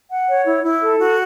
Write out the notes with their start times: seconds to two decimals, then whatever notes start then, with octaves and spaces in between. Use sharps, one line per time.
0.09 F#5
0.26 C#5
0.45 E4
0.63 E4
0.81 A4
0.98 F#4